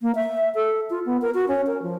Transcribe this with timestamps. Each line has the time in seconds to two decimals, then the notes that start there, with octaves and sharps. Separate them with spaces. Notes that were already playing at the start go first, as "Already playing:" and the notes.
0.02 A#3
0.15 E5
0.55 A4
0.90 F4
1.06 B3
1.22 A#4
1.34 F#4
1.48 C#4
1.67 A#4
1.82 F3